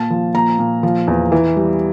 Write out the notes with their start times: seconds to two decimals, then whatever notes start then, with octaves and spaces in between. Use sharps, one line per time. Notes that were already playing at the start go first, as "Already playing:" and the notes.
Already playing: A#2 A5
0.10 F3
0.34 A#2 A#5
0.59 A#2
0.83 F3
1.07 E2
1.32 E3
1.57 G3